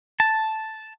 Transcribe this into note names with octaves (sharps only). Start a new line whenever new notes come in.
A5